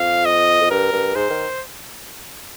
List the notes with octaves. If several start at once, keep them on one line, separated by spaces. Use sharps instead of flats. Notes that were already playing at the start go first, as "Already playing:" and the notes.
Already playing: F2 F5
D#5
F2
G2 A#4
G2
G#2 C5
D#3